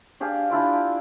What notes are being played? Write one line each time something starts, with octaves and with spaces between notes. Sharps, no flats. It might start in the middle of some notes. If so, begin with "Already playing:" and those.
D4 G4 G#4 F5
D4 E4 F4 D5